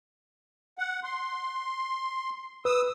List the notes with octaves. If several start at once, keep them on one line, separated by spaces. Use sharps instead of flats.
F#5
C6
B4 D#6 E6